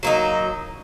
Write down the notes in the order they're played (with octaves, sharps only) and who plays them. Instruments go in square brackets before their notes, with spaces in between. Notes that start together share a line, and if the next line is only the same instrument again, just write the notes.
[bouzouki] F#3 A#3 D#4